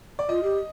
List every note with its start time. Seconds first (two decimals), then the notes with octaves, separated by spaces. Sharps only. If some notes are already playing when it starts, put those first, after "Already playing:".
0.19 D5
0.29 F4 D#5
0.43 G4